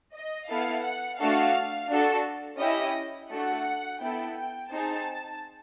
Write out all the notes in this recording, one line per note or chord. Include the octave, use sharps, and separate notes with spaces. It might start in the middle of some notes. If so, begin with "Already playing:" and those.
D#5
B3 E4 A4 F5
F#5
A3 D4 F#4 A4 F5
D4 F#4 A4
C#4 E4 G4 D#5
A3 D4 F#4 A4 F#5
B3 E4 A4 G5
G5
C4 D#4 G#4 A5